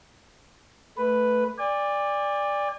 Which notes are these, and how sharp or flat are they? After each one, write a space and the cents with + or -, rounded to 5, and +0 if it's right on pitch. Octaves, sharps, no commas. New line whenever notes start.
A3 +0 B4 +0
D5 +0 G#5 -45